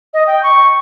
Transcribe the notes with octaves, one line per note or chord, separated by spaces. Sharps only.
D#5
G5
C#6